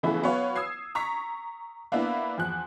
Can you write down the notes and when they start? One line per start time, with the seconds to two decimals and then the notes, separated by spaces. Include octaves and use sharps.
0.03 C#3 E3 F3 A3 B3 E4
0.22 F#3 B3 C#5 F5
0.56 D#6 E6 G#6 C7
0.95 A#5 C#6 B6
1.92 A#3 B3 D4 E4
2.38 E2 F3 F#6